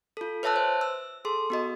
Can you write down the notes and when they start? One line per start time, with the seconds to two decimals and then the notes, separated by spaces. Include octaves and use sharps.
0.17 F4 A4
0.43 B4 C#5 E5 A5 E6 F#6
0.56 C5
0.81 E6
1.25 G#4 A4 C6
1.50 B3 F#4 D#5